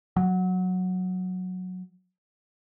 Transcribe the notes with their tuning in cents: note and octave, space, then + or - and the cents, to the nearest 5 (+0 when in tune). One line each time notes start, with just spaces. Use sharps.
F#3 -10